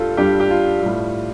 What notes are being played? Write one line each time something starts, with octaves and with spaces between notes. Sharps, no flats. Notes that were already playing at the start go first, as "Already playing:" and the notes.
Already playing: G2 G3 F4 G4 A4
G2 G3 D4 G4
G4
F4
A2 G3